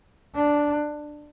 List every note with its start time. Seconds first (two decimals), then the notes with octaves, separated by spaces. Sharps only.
0.35 D4